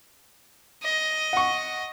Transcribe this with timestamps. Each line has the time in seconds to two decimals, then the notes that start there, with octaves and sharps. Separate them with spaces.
0.84 D#5
1.33 F#5 C#6